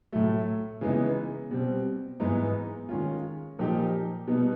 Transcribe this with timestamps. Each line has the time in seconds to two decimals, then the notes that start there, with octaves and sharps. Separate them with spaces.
0.13 A2 F#3 A3
0.81 C#3 E3 G#3 B3 D#4
1.51 B2 G3 C4
2.20 G#2 E3 G#3 B3 D#4
2.89 D#3 G#3 C#4 F4
3.59 A#2 F3 A#3 D#4 G4
4.28 B2 G3 B3 D#4